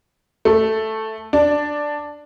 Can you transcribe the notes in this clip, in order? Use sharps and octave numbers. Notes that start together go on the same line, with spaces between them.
A3
D4